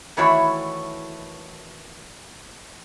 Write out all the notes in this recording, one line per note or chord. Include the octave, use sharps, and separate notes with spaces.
D#3 E3 A3 E4 F#4 C#5